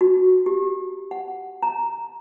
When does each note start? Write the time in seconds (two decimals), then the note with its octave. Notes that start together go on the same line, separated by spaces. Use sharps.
0.01 F#4
0.46 G4
1.11 F#5
1.63 A#5